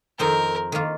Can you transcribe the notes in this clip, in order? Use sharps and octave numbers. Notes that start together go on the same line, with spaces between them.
F2 D#3 C4 D#4 A#4
D#3 A#3 F4